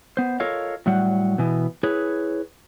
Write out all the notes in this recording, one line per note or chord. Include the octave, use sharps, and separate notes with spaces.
B3 C5
F4 A4 A#4 C#5 D#5 F5
A2 F#3 G3 F#5
B2 E3 B3
E4 G#4 B4 C#5